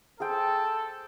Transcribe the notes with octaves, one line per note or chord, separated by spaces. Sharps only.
G#4 A4 C5 G5